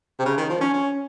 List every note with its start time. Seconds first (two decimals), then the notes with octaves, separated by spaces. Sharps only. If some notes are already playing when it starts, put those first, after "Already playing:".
0.19 C3
0.26 C#3
0.37 D#3
0.49 F3
0.61 C#4
0.73 C#4